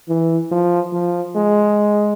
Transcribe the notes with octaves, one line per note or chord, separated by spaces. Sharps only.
E3
F3
F3
G#3